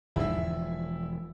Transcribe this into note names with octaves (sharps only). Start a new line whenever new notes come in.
E1 E2 G#2 D3 F3 E4 E5